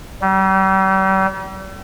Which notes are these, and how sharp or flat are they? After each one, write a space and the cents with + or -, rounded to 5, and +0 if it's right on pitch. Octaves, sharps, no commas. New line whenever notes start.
G3 -40